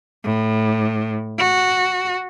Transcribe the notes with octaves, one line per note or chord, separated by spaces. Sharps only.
A2
F#4